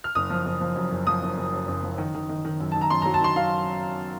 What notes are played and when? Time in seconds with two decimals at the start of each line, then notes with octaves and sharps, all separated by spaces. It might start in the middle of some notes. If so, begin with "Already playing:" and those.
0.04 F6
0.15 F#1 D#6
0.30 F3
0.45 F#1
0.61 F3
0.76 F#2
0.92 F#1
1.07 F3 D#6
1.22 F#1
1.37 F#1
1.53 F#2
1.68 F#1
1.83 F3
1.98 D#3
2.15 D#3
2.29 D#3
2.45 D#3
2.60 F#2
2.72 D#3 A5
2.81 A#5
2.90 F#2 C6
3.02 F#3 A#5
3.14 A5
3.21 D#3 C6
3.36 F#3 F5